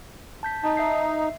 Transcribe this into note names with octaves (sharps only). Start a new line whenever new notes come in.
A5 G6 B6
D#4 A5
E5 C7